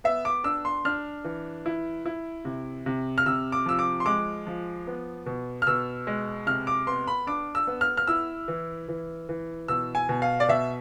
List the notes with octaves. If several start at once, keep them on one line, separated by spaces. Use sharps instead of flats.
B3 E5
D6
D4 E6
C6
D4 F6
E3
E4
E4
C3
C3
F6
C3 E6
D6
F3 E6
D6
C6
G#3 D6
F3
B3
B2
F6
B2 E6
G#3
C3 F6
D6
B3 C6
B5
D4 D6
E6
B3
F6
F6
E4 E6
E3
E3
E3
B2 E6
G#5
B2
F5
D5
B2 E5